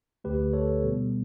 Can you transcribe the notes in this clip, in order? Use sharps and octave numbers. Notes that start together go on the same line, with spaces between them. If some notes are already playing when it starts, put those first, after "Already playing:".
D2 D3 A3 G4 B4
A4 C#5
B2 G3 B3